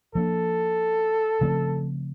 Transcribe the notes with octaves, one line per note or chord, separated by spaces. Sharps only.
F3 A#3 D4 A4
C#3 F3 A3 C4